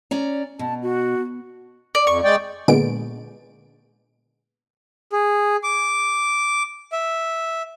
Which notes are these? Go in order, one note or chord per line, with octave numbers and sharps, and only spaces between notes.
C#4 D5 A#5
B2 A5
F#4
D5
F2 C#6
G#3 D5 G5
A#2 D3 G#3 B3 D7
G#4
D6
E5